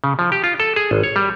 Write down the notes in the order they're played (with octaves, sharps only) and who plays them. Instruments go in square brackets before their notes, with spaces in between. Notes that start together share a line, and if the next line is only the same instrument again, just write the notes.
[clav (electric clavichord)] C#3
F3
G4
F4
A4
G#4
G#1
C#5
G3